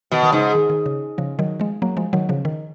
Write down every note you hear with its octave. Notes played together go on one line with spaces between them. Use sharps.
B2 D#3
D#3
G#2 C#3
D#3
D#3
C#3
C#3 F3
D#3 F#3
F3 G#3
F#3 A#3
F3 G#3
D#3 F#3
C#3 F3
D#3